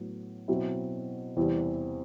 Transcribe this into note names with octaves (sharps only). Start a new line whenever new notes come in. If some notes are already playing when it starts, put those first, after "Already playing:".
Already playing: A2 F#3 B3
B2 F#3 C4 E4
E2 C3 E3 G3 C4